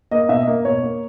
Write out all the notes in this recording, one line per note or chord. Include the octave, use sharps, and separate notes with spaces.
A#3 D#5
B2 E5
D#5
A#3
B2 C#5
A#3